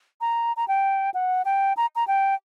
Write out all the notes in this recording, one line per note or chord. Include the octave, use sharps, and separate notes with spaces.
A#5
A#5
G5
F#5
G5
A#5
A#5
G5